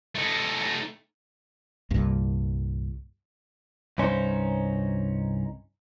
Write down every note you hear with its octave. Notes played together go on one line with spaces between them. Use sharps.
A3 D#4
C2 G2 A#2
C2 G2 C#4 D#4 C5